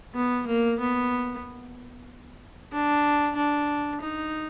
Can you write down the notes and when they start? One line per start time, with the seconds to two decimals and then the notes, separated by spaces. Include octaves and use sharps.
0.15 B3
0.47 A#3
0.80 B3
2.72 D4
3.35 D4
4.00 D#4